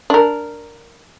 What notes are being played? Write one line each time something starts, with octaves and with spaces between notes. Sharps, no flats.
D4 A#4